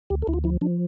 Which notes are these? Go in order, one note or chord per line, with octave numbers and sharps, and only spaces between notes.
D2 G4
A4
D2 E4
F4
F3 E4
F3 D4